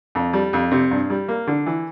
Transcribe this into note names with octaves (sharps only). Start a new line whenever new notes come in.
F2
G3
F2
C3
G2
G3
A#3
D3
E3